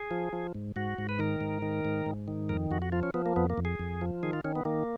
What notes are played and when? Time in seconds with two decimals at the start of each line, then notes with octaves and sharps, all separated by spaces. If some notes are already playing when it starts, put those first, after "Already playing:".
Already playing: G#4
0.11 F3
0.33 F3
0.55 G#2
0.76 G#2 F#4
0.98 G#2
1.09 B4
1.19 D#3 A#4
1.41 G#2
1.62 D#3
1.85 G#2
2.06 G#2
2.28 D#3
2.49 F2 A#4
2.71 F2 F#4
2.82 F#4
2.92 F3 F4
3.03 C#4
3.14 F3 B3
3.26 A#3
3.36 F2 B3
3.50 A#3
3.58 F2
3.65 G#4
3.79 F2
4.01 F3
4.23 D#3 G#4
4.33 F4
4.44 D#3 C#4
4.56 B3
4.65 D#3 A#3